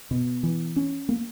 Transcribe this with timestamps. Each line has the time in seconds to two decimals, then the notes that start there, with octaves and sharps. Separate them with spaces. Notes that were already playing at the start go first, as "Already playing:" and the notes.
0.11 B2
0.43 E3
0.76 C#4
1.09 A#3